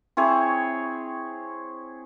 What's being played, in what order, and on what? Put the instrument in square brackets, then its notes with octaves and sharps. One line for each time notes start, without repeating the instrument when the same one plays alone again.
[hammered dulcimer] C4 E4 G#4 C#5